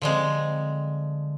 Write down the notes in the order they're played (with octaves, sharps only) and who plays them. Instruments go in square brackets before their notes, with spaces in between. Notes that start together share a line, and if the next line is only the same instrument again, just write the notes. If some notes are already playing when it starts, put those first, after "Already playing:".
[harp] D3 C4 [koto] F3 G3 G#3